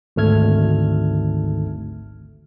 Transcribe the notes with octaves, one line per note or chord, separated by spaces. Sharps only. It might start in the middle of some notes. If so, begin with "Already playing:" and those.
G#1 D2 A3 A4 F6 G#6